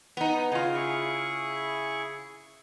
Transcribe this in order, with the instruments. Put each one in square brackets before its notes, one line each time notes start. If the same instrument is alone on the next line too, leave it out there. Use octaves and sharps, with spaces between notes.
[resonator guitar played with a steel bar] B3 D#4
[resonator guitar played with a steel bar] C#3 F4 [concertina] D#5
[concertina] E4 G#4 C#6